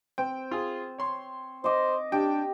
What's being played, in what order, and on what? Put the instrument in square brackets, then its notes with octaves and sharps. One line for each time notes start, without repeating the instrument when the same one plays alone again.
[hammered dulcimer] C4 [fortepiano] G5
[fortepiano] F4 G#4
C#5 C6
[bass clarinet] C5 [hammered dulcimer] D#5 D6
[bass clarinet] D4 [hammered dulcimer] G4 [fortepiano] G5